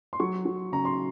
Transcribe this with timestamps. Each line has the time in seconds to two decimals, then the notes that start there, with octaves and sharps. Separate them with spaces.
0.13 C6
0.20 F#3 C#6
0.45 F#3
0.72 C#3 A#5
0.85 C6